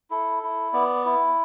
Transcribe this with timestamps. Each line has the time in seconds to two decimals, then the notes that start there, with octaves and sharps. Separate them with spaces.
0.10 E4 A4
0.43 E4
0.73 B3 D5
1.05 E4